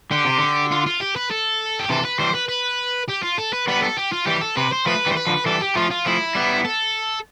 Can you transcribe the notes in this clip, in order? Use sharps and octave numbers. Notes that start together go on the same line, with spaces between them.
D3 G4
C3
D3
F4
F4
G4
B4
A4
G4
C3 E3 A4
B4
E3 G3 C5
B4
B4
G4
F4
A4
B4
G3 B3 B4
A4
G4
F4
E3 G3 G4
A4
C3 B4
C5
F3 A3 B4
E3 G3
C5
B4
D3 F3
E3 G3 A4
G4
F3 A3 F4
F4
F3 A3 E4
G3 B3
A4